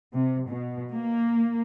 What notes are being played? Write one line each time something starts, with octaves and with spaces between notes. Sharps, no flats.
C3
B2
A#3